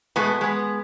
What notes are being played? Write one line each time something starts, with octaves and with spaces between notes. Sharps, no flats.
B2 G#3 A3 B3
G#3 B3